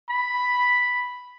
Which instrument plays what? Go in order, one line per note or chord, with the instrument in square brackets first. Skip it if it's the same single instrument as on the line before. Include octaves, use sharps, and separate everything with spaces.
[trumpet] B5